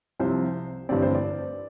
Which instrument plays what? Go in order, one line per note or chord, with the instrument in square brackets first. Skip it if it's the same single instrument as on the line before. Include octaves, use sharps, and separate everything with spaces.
[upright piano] C2 C3 F3 C4 C5
A1 G2 D3 G3 C4 D5
C5
D5